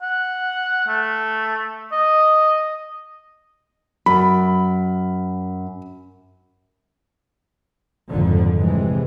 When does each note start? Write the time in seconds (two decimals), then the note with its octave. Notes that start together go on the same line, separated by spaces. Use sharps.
0.02 F#5
0.88 A3
1.92 D#5
4.06 F#2 B5
8.09 G#1 F2 D3
8.58 C3 E3 G3 G#3